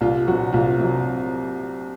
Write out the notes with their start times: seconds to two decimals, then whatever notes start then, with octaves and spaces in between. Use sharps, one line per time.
0.01 C2 F4
0.27 C3 F#3 F#4
0.53 C2 F4
0.79 C3 F#3